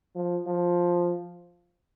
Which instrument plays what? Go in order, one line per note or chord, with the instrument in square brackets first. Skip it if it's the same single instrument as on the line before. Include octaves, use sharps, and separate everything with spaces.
[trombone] F3
F3